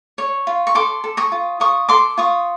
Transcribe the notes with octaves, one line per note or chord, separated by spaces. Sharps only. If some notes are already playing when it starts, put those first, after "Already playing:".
C#5
F4
C#6
A4 C6 D6
A4
C#6 D#6
F4
F4 C#6 D#6
A4 C6 D6
F4 C#6 D#6